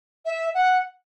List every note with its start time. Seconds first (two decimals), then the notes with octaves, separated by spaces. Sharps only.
0.26 E5
0.54 F#5